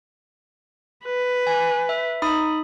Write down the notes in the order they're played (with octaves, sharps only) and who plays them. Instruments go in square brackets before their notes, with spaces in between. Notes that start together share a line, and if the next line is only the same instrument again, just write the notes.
[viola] B4
[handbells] G#5
E5
D#4 B5 D#6